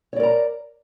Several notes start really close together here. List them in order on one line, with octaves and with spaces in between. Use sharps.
C#5 D5 A#4 A#5